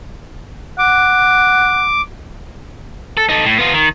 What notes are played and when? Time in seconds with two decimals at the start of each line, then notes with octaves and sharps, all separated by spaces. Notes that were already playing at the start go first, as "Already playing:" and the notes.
0.79 F#5 D6
3.17 A4
3.29 D#4 A4
3.45 A2
3.58 B3 F4
3.73 D#3